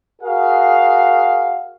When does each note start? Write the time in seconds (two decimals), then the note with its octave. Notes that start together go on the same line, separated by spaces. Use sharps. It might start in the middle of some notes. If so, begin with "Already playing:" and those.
0.22 F#4 G#4 A#4 F5